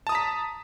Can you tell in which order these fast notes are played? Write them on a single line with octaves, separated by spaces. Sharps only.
A5 D#6 A#5 B6